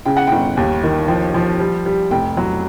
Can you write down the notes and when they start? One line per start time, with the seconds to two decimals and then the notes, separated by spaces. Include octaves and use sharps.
0.06 C#3 G5
0.17 F#5
0.27 G1 G5
0.57 D#2
0.84 D#3
1.08 F3 G5
1.34 F3
1.60 G3
1.86 G3
2.11 F1 G5
2.37 F#3